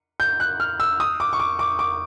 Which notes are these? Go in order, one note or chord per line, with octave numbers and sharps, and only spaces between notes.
G6
F#6
F6
E6
D#6
D6
C#6
D6
D6
D6